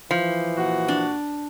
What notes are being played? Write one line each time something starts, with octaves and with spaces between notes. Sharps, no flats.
E3 F3
A#2 F#4
D4